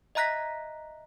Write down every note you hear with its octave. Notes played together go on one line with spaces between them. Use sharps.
D#5 E5 A#5 F#6 A#6 B6